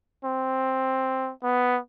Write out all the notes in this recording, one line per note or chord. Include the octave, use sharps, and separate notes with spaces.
C4
B3